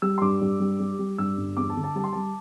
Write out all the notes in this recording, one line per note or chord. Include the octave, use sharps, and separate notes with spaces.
G3 E6
C6
G2 D6
G2
G3
G3
G3
G2 E6
G1
E2 D6
A5
D3
A5
G3 A5
C6
G3 A5